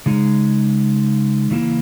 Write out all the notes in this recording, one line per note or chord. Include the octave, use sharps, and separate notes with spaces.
C#3 G#3 D#4
C#3 E3 A#3 E4